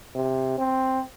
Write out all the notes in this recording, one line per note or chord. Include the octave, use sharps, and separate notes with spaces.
C3
C4